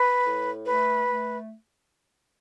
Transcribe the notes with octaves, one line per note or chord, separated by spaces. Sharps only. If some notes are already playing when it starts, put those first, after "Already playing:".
Already playing: B4
A2
A3 B4
A3